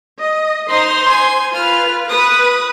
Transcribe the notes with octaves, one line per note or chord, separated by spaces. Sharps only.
D#5
D#4 C5 C6
G#5
F4 B4 F6
B4 D#6